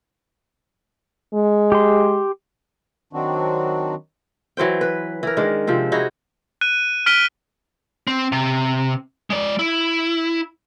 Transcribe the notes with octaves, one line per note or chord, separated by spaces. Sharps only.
G#3
G4 C6
D#3 F#3 C4 D4 F#4
E3 F#3 C5 G5
B4
E3 A#4
D#3 G#3 D4
C3 F3 C4
D#4 E4 F#4 G#4
F#6 D#7
F6 B6 D7 D#7 G7
C4
C3
G#3 D5
E4